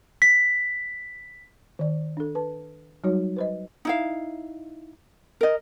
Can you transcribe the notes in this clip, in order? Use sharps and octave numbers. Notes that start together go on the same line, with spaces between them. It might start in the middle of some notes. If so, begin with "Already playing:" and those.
B6
D#3 D5
D4 A4
B4 A5
F#3 G3 D#4 F#4 C#5
B4 C5 D#5
D#4 E4 F5
A#4 D#5